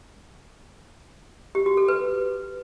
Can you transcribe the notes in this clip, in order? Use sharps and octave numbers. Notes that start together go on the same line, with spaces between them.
G4
F#4
A4
B4